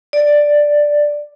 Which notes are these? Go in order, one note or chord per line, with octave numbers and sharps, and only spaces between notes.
D5